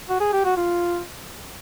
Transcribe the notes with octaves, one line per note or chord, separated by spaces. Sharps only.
F#4
G#4
G4
F#4
F4